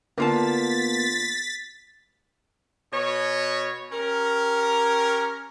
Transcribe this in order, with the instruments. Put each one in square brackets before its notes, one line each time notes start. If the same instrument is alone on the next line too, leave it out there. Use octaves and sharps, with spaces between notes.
[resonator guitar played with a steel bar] D3 F4 A5 [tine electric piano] A#3 B3 [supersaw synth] A6 B6
[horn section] B2 C#5
C#4 G4 A#4